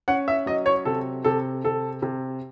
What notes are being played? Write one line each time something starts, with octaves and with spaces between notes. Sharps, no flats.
C#4 F#5
E5
F#3 D#5
C#5
C3 A4
C3 A4
C3 A4
C3